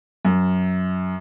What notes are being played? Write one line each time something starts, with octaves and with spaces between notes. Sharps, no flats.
F#2